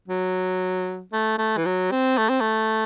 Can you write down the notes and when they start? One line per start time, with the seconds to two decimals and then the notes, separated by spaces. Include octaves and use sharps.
0.08 F#3
1.13 A3
1.38 A3
1.57 E3
1.65 F#3
1.91 C4
2.18 A3
2.29 C4
2.41 A3